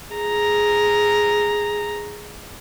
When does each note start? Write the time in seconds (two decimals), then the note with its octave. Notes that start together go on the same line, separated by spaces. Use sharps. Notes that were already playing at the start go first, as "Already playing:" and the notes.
0.14 G#4 A#5